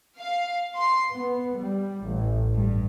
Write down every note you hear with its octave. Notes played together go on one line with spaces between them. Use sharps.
F5
C6
B3
G3
A1
G2